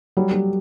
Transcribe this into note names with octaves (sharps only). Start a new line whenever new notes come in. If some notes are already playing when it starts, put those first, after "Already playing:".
F#3 G3
G3